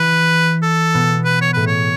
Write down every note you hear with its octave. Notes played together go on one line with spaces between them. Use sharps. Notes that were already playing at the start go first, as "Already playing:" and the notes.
Already playing: E3 E4 B4
A4
B2 B3
B4
C#5
A2 A3 B4
C#5